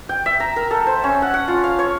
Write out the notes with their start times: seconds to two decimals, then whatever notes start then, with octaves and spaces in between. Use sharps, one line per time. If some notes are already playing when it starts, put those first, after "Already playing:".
0.09 G5
0.26 E5
0.40 A#5
0.56 A#4
0.71 A4
0.87 C5
1.04 C#4
1.22 F#5
1.34 F#5
1.48 F4
1.64 F5
1.79 C#5